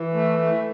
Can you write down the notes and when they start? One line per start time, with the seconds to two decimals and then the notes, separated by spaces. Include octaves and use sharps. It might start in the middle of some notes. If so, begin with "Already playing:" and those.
Already playing: E3
0.14 A3
0.39 A3